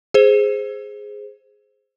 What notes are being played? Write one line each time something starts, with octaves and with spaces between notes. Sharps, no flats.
G#4 C5